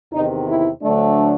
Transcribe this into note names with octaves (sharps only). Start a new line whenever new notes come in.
E2 C3 D#3 D#4
E4
D2 D3 F#3 A3 D4